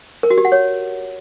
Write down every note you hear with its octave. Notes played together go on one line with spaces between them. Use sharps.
A#4
F#4
G4
F#5
C#5